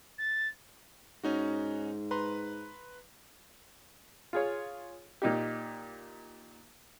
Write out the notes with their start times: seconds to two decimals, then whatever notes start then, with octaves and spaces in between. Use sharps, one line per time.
0.18 A6
1.24 G#2 C#4 D#4 F#4
2.11 B4 A#5 C6
4.33 F4 G#4 C#5
5.22 A#2 D#4 G4